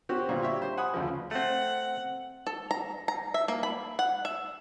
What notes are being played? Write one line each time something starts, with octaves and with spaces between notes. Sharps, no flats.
C4 C#4 F#4 G4
A#2 D3 G3
G4 C#5 E5
C5
F#5 G#5 B5 D#6
D2 C#3 F3
A3 C4 F#5
A4
A#5
A#5
E5
A#3
B5
F#5
E5